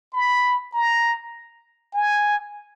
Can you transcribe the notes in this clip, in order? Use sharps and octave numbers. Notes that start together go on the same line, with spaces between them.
B5
A#5
G#5